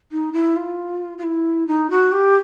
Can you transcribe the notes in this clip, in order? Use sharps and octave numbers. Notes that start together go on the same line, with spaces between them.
D#4
E4
F4
F4
E4
D#4
F#4
G4